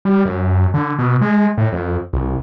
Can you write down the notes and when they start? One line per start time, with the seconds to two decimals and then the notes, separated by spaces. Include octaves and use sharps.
0.05 G3
0.26 F#2
0.74 D3
0.99 B2
1.21 G#3
1.58 A2
1.72 F2
2.13 C2